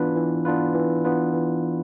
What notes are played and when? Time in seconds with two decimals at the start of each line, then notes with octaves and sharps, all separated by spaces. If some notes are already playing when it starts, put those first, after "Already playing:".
Already playing: E3 B3 D4 F4 B4
0.16 E3
0.45 B3 D4 F4 B4
0.75 E3
1.04 B3 D4 F4 B4
1.33 E3